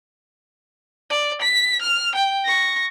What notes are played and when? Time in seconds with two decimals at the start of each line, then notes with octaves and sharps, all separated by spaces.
1.10 D5
1.42 B6
1.82 F6
2.15 G5
2.45 C#6 A#6